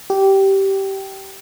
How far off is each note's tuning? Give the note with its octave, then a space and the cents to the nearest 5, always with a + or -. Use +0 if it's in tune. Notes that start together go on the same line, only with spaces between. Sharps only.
G4 -15